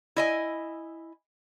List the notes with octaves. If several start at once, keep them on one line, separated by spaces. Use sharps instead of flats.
E4 D#5 G#5